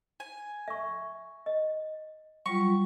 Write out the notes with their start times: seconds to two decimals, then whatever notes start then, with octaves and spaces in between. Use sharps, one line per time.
0.20 G#5
0.68 E5 C#6
1.46 D#5
2.46 F#3 G3 F4 C#6